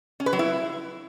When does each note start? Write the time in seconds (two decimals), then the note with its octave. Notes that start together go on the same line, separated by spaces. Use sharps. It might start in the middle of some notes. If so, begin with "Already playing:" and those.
0.20 C#4
0.26 B4
0.33 F#3
0.39 E4